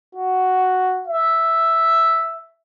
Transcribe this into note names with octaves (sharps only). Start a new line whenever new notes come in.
F#4
E5